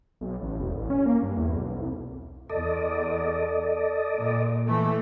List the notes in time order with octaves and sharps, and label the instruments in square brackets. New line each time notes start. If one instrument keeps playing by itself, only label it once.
[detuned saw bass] B1
A1
E1
A1
C#4
A#3
G2
E2
B1
C2
[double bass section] E2 [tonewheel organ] A4 D5 D#5
[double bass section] A#2
E3 A3